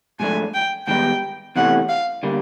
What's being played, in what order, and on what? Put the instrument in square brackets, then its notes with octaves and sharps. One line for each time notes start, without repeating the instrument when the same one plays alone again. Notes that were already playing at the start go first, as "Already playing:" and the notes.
[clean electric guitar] G#2 F3 A3 D4 [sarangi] G#5
[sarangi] G5
[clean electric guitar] G#2 D#3 G3 B3 D#4 [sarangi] G5
[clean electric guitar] E2 C3 E3 A3 C#4 [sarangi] F#5
[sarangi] F5
[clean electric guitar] D3 G3 A#3